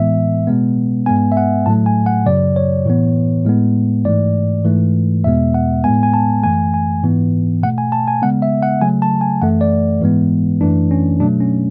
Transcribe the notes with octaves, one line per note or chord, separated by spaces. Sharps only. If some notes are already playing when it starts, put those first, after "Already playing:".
Already playing: A2 E3 G#3 B3 E5
B2 G#3 B3
G#2 G#3 B3 G#5
E5
F#5
A2 F#3 A3 A5
G#5
F#5
F#2 C#3 F#3 D5
C#5
A2 E3 B3
A2 G#3 B3
G#2 E3 A3 D5
G#2 E3 A3
E2 B2 G#3 B3 E5
F#5
A2 G#3 B3 G#5
G#5
A5
F#2 E3 A3 G#5
G#5
G#2 E3 B3
B2 A3 F#5
G#5
A5
G#5
C#3 G#3 B3 F#5
E5
F#5
C#3 F#3 A3 G#5
A5
G#5
F#2 E3 A3 F#5
D5
G#2 E3 G#3 B3
F#2 E3 A3 D4
C#4
B2 F#3 A3 D4
C#4